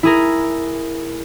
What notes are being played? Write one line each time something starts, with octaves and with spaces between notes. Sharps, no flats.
E4 G#4 A#4